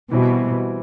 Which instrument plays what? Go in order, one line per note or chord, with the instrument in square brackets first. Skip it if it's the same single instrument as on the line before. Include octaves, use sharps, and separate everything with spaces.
[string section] B2 [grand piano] E3 G3 C4 E4